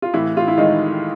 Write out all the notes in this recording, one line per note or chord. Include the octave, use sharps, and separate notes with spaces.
F4
A2 E3 E4
F4
E4
D#3 G#3 D#4